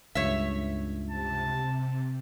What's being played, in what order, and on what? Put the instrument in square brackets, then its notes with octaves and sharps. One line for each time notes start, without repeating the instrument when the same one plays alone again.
[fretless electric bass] C#2 G2 [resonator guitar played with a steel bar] C#5 E5
[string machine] C3 [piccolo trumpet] A5